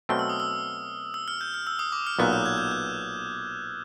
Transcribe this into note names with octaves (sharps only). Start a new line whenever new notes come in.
B2 F#3 A3 C4 F6
E6
D#6
E6
E6
F6
G6
F6
E6
D#6
D6
F6
B1 A#2 F#3 B3 F#6
G6
G#6
G6
F#6